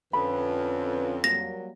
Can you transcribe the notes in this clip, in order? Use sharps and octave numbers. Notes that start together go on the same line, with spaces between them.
F2 D3 C#4 B4 B5
F#3 G3 A#3 A#6